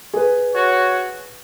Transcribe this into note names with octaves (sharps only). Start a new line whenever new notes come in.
G#4 B4
F#4 C#5